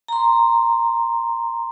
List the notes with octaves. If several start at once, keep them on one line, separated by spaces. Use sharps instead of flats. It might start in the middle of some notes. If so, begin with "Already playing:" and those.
A#5 C6